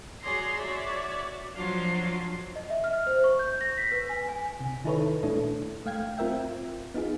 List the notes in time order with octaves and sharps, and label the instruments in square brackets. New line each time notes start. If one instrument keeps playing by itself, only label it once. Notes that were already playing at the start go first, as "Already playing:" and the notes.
[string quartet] F#4 G#4 C#5 D5 A#5 C6
F#4 C#5 D5 E5
F3 F#3 D4 F4
[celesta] D#5
E5
F6
C5
C#6
G6
A#6
B6
B4
G#5
G#5
[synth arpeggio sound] C3
D#3 D#4 E4 A4 B4 C#5
A#2 A3 D4 E4 A4
A3 F5 G5 G#6
C4 F4 A#4 E5 G5
B3 D#4 F4 G#4